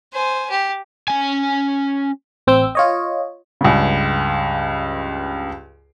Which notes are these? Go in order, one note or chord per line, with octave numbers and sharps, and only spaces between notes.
C5 G#5
G4
C#4 G#5
A1 C4 G5 E6 G6
F4 C#5 D#5
C#2 G2 C#3